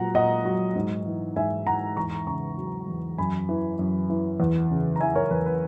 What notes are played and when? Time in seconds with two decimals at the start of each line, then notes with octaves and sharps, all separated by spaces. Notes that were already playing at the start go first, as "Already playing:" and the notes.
Already playing: A#2 F#3 F#5 A#5
0.14 A#2 D#5 F#5
0.45 F#3
0.76 G#2
1.06 E3
1.36 G#2 E5 G#5
1.67 E3 F#5 A#5
1.96 E2 A#5 C#6
2.27 C#3 A#5 C#6
2.58 F#3
2.88 E2
3.18 F#2 G#5 B5
3.49 E3
3.79 F#2
4.10 E3
4.40 E2
4.70 C#3
4.96 A#5
5.00 E3 E5 G#5
5.15 A#4 C#5
5.31 E2 B4
5.46 B4